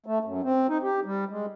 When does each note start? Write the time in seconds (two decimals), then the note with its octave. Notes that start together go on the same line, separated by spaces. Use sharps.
0.06 A3
0.25 F#2
0.44 C4
0.69 D#4
0.82 G4
1.05 G3
1.29 G#3